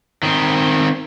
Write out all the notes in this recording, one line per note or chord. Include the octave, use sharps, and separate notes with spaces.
D#3 C4